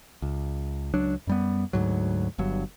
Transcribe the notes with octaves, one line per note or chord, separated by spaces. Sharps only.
C#2
C#2 F#3 D4
F#2 G3 B3
D2 G#2 F#3
G1 G2 F#3